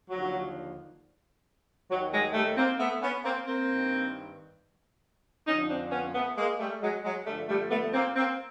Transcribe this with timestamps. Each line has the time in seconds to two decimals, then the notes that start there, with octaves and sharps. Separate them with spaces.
0.11 D#2 D3 F3 F#3
1.90 D#2 D#3 F#3
2.12 F#3 G#3
2.34 G3 A3
2.57 A#3 C4
2.79 A3 B3
3.01 B3 C#4
3.23 A#3 C4
3.45 A#3 C4
3.68 G2 D#3
5.47 F2 D3 F3 C#4 D#4
5.69 C4 D4
5.91 B3 C#4
6.14 A3 B3
6.37 G#3 A#3
6.59 G3 A3
6.81 F#3 G#3
7.03 F#3 G#3
7.26 G2 D3 F3 G3 A3
7.48 G3 A3
7.70 A3 B3
7.93 A#3 C4
8.15 A#3 C4